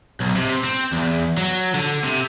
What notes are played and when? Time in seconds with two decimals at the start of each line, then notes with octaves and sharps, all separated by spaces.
0.21 B1
0.36 C3
0.64 C4
0.92 E2
1.38 F#3
1.75 D3
2.04 C3